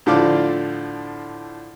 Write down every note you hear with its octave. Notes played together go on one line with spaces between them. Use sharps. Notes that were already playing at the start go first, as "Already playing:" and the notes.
A2 D3 F3 D5 F5 D6